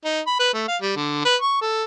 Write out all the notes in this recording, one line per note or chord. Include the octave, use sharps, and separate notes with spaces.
D#4
B5
B4
A3
F5
G3
D3
B4
C#6
A4